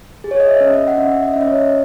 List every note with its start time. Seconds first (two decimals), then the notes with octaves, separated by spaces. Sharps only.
0.24 G#4
0.31 C#5
0.40 D#5
0.49 E5
0.61 C#4
0.74 D#5
0.88 F#5
0.98 C#4 E5
1.23 D#5
1.33 E5
1.36 C#4
1.41 D#5
1.48 C#5